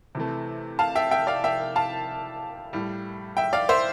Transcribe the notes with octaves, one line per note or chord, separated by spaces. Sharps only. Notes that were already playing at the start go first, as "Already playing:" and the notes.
C3 E3 A3
F5 A5
E5 G5
E5 G5
D5 F5
E5 G5
F5 A5
A2 G3
E5 G5
D5 F5
C5 E5